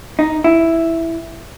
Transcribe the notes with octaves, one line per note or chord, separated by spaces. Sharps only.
D#4
E4